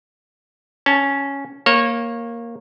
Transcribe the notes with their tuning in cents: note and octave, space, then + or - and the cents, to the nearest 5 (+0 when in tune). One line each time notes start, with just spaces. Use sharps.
C#4 +0 A5 -20
A#3 +0 C#5 -20